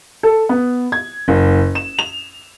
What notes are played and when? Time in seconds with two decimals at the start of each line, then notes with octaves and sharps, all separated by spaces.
0.23 A4
0.49 B3
0.92 G#6
1.28 F#1
1.75 E7
1.99 F7